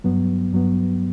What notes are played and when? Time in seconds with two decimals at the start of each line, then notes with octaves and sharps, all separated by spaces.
0.04 G2 F#3 B3
0.53 G2 F#3 B3